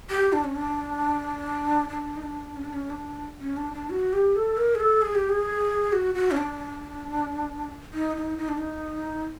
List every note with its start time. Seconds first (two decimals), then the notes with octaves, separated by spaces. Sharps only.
0.10 G4
0.33 D4
0.44 C#4
0.55 D4
1.89 D4
2.17 D#4
2.23 D4
2.56 C#4
2.64 D4
2.73 C#4
2.90 D4
3.41 C#4
3.57 D4
3.74 D4
3.90 F#4
4.13 G4
4.36 A4
4.57 A#4
4.75 G#4
4.80 A4
5.02 G#4
5.15 G4
5.29 G#4
5.92 F#4
6.15 F#4
6.31 C#4
6.37 D4
7.94 D#4
8.17 D#4
8.38 D#4
8.48 D4
8.58 D#4